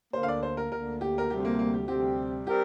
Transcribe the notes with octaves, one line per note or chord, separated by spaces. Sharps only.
D2 D3 A#3 C5
F5
D5
C5
A#4
D2 D3 A#3 A#4
G4
A#4
D2 C3 G3 C4 G4
A#3
A#3
G4
D2 C3 G3 C4 G4
G3 C4 G4 A#4